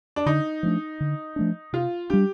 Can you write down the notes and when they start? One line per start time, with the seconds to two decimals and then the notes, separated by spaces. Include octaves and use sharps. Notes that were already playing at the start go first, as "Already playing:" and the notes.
0.16 D4
0.26 D3 D#4
0.63 F3 A3 D4
1.00 D3
1.36 F3 A3 D4
1.73 C3 F4
2.10 G3 D4 G4